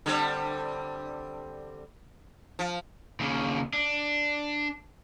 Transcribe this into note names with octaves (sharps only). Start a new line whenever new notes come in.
D3 G3 C4
F3
D#2 C#3
D4